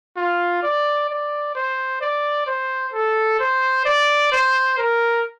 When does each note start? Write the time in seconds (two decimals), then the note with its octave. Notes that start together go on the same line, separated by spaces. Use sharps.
0.17 F4
0.63 D5
1.09 D5
1.55 C5
2.01 D5
2.47 C5
2.94 A4
3.40 C5
3.86 D5
4.32 C5
4.78 A#4